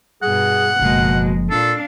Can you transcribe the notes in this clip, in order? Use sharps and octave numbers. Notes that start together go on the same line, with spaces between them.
G2 B2 G#4 F#5
F#1 B2 F3 G#3 A#3
A#2 D4 A4 F5